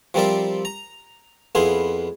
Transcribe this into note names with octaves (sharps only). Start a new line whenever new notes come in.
F3 G3 C4 A#4 D5 E5
A#5
F2 B3 E4 G#4 F5 C6